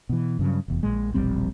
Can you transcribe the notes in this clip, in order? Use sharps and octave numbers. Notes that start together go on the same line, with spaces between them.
B2 E3
G2 C#3 F#3
F1 E2
A#1 D#2 A#2 G#3
E1 A#1 G3 C4